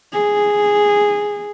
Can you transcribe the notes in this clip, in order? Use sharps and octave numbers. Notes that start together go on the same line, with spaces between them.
G#4